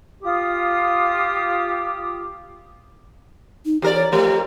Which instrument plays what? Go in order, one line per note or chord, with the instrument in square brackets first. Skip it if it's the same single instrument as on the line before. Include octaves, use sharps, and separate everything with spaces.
[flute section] F4 D#6 [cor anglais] G4
[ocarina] D#4
[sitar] E2 A#4 D5 [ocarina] G4
[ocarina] C#5
[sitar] F2 A3 A#4 [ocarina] G4